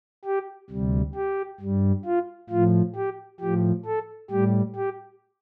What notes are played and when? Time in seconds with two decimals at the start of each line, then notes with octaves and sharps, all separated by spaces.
0.25 G4
0.70 D2 C3 G3
1.15 G4
1.60 G2 G3
2.05 F4
2.50 A2 F3 F4
2.96 G4
3.40 A2 F3 G4
3.86 A4
4.30 A2 G3 G4
4.75 G4